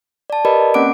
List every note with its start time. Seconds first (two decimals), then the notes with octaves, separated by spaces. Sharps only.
0.30 D5 A5
0.45 G4 A#4 B4 D5 D#5 B5
0.74 A#3 C4 C#4 F#5 D6 D7